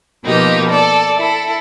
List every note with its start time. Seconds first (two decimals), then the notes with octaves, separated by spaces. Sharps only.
0.25 B2 F3 A#3 D#4 G4
0.69 A4 D5
1.17 E4 A4